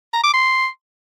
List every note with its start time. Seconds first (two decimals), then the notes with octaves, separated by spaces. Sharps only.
0.14 A#5
0.23 D6
0.33 C6